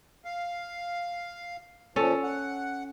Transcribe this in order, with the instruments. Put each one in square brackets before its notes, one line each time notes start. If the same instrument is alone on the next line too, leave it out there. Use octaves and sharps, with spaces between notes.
[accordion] F5
[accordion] A#2 F3 [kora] C#4 A4
[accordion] F#5